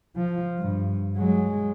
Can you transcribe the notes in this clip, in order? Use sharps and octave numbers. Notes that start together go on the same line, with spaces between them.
F3
G2
F#3 G#3